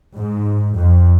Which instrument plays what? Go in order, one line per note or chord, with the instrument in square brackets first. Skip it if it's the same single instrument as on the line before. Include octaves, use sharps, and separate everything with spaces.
[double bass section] G#2
F2